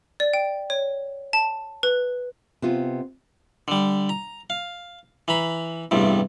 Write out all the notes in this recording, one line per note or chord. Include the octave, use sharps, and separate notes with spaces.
D5
G5
C#5
A5
B4
C3 B3 F4
D3 G3
A#5
F5
E3 A#5 B5
A1 E2 G2 C3